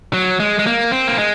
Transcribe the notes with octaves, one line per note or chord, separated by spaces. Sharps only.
F#3
G#3
G#3
A#3
C4
A#3
G#3